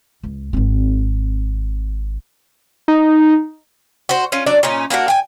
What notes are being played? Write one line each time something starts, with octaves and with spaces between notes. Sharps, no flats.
C#2
G#1 C4
D#4
F#4 C5
C#4 F4
F#3 D4 D5
A#2 C#4 D#4
A#3 C#4 D4 F#4
G5 G#5